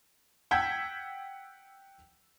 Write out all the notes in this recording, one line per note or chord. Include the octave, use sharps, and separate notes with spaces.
F#5 G5 E6 G6 G#6 B6